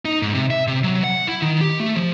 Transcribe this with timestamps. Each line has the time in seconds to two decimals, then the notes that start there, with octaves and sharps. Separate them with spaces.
0.05 D#4
0.22 G#2
0.34 C3
0.50 E5
0.67 C3
0.84 F#3
1.04 F#5
1.27 E4
1.42 D#3
1.61 G4
1.80 A3
1.96 F3